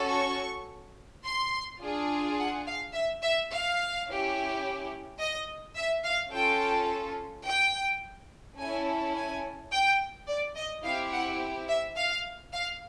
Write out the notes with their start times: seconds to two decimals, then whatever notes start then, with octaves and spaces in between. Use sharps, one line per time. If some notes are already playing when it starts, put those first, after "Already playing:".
Already playing: C#4 F#4 A4
0.12 C#6
1.25 C6
1.81 D4 F4 G#4
2.38 F#5
2.67 F5
2.94 E5
3.23 E5
3.51 F5
4.08 C#4 E4 G4
5.20 D#5
5.76 E5
6.05 F5
6.32 C#4 F4 A4 G5
7.46 G5
8.58 C#4 E4 A4 G#5
9.14 G#5
9.72 G5
10.27 D5
10.56 D#5
10.84 C4 E4 G4 F5
11.12 F#5
11.69 E5
11.96 F5
12.53 F5